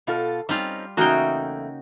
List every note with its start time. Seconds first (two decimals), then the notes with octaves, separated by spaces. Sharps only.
0.07 B2 F4 A4
0.49 G3 C4 C#4 D#4 F4
0.97 E2 C#3 A3 A#3 D#4 F#4 G5